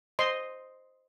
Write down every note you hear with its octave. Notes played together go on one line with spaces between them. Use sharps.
C5 D#5 C6